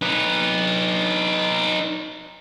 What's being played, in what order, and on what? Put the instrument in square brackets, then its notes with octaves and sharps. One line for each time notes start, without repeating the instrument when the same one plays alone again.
[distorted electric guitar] D#4 B4